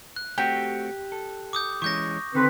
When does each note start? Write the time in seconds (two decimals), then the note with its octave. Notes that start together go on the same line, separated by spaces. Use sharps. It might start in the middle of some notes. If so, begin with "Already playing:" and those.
0.16 F#6
0.38 A3 C4 F#4 G4
1.12 A4
1.53 D6 D#6 G6
1.82 E3 G#3 C#4 C#6 G6 A#6
2.35 D3 D#3 C4 B4